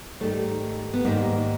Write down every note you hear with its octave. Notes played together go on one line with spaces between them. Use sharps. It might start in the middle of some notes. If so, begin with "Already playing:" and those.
G#2 D#3 G3 A3
B3
G#2 D#3 G3 A#3